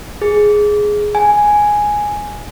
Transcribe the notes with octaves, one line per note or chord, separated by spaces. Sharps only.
G#4
G#5